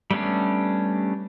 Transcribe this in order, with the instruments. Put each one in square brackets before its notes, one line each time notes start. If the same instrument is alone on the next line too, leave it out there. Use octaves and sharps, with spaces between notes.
[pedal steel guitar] G3 A3 B3 C#4 D4